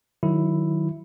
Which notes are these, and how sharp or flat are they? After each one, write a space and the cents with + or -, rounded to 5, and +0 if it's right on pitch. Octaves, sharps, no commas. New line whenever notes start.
D#3 -15 F#3 +0 E4 +0